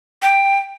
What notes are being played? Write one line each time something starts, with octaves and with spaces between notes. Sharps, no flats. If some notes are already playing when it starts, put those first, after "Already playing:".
G5